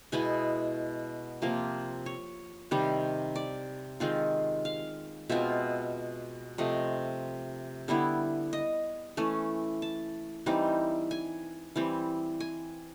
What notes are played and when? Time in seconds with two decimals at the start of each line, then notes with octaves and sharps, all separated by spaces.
0.12 B2 G#3 B3 E4 G#5
1.42 C3 F3 A#3
2.06 C#5
2.71 C3 D#3 G3
3.36 D5
4.00 D#3 G#3 C4 F4
4.65 F5
5.29 B2 G#3 C4 F4 E5
6.58 C3 F3 A3 D#5
7.88 D3 G3 B3 E4
8.53 D#5
9.17 E3 A3 C#4
9.82 A5
10.46 E3 G3 C4 D#4
11.11 G#5
11.76 E3 G3 C4
12.40 G#5